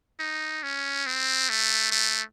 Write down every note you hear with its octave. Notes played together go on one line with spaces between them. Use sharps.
D#4
C#4
C4
A3
A3